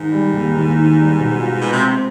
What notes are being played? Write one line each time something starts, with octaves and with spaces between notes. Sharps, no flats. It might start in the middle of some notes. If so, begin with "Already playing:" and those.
Already playing: G#2 D#3
G3
D#2
D#2
D#3
G3
B2
F4
B2 G#3
C3
C4